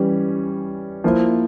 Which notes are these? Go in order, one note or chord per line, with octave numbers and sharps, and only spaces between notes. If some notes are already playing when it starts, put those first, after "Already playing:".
Already playing: E3 G3 C#4
F3 A#3 E4